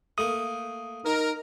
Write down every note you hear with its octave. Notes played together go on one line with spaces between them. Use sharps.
A3 A#3 D#6
D#4 A#4